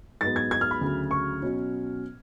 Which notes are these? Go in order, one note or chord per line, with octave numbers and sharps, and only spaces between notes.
G#2 F#3 B3 A6
G#6
G#6
F6
B5
D2 C#3 F#3
C#6
B2 F#3 C#4